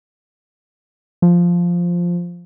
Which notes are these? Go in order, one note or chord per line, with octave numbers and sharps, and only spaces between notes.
F3